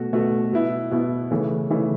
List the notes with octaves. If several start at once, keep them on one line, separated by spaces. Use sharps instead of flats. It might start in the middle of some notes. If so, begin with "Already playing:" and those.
Already playing: B2 A3 F#4
B2 A3 F#4
B2 B3 E4
B2 B3 E4
C#3 E3 A3
C#3 E3 A3